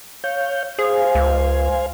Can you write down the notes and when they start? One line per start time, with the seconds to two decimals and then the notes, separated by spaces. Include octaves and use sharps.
0.24 C#5 F5 G6
0.79 G#4 C5 F5 G#5
1.15 C#2